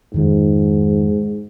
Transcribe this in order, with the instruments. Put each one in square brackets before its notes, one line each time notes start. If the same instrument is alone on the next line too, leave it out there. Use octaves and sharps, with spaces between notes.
[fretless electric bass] F2 D#3 F3 [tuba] G#2